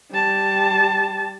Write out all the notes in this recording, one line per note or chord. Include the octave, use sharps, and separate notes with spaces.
G3 A5